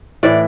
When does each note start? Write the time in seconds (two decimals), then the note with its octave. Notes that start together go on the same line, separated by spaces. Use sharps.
0.23 A2 E3 D5